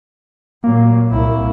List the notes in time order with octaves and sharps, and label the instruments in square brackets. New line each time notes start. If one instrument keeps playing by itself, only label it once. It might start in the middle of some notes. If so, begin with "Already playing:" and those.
[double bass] A#2 F#3 [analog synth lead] A#3
[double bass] C2 E4